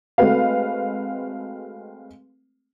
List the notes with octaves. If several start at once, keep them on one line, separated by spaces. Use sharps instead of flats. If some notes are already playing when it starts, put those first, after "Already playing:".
G#3 A3 C4 F#4 B4 F5